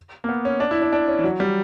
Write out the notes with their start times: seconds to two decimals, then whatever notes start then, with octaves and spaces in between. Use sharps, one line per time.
0.24 A#3
0.29 B3
0.45 C#4
0.60 D4
0.71 E4
0.82 D4
0.93 D4
1.08 C#4
1.19 E3
1.24 F#3
1.40 G3